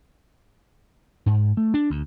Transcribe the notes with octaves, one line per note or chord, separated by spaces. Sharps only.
G#2
A3
D4
D2